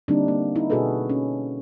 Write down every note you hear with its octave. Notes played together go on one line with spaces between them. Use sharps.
D3 G3 A#3 C4 D4 D#4
A#3
D#4 E4
B2 F#4 G#4 A4 B4
C#4